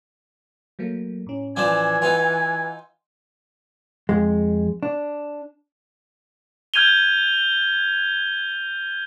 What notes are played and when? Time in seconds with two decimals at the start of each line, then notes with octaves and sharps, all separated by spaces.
0.79 F#3 A3 A#3
1.27 A2 C#4
1.56 E3 F3 D4 G#5
2.02 D#4 F4 B4 E5 F#5
4.09 F2 G#3
4.83 D4
6.74 F6 G6 G#6 D#7 F7 G7